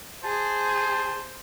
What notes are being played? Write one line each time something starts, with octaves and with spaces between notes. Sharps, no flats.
G#4 C5 A5